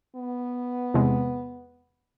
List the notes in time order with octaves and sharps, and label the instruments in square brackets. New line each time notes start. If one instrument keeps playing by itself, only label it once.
[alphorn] B3
[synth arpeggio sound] E2 C3 G#3